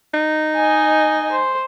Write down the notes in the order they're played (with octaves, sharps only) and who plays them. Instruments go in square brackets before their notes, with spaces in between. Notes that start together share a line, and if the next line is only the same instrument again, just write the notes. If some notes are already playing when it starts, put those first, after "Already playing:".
[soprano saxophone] D#4
[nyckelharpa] D#5 G#5
C5